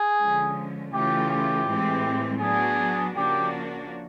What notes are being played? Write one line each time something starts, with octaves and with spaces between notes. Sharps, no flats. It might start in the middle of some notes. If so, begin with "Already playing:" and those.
Already playing: G#4
D3 F3 G#3 C#4
C#3 E3 A3 C#4 F4 G4
G4
A2 E3 G#3 C4
F#3 B3 D4 F#4 G#4
C#3 F3 A#3 D4 F#4 G4